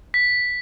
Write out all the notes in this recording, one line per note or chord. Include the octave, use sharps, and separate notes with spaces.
B6